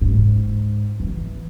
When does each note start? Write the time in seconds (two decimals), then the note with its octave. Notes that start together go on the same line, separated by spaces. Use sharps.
0.01 G#2
1.00 E3